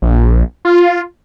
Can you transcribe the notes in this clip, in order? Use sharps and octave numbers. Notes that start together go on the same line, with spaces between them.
A#1
F4